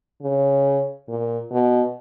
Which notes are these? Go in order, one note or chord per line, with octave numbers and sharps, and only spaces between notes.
C#3
A#2
B2